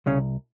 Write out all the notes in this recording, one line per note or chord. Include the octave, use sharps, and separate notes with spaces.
C2 C#3 C#4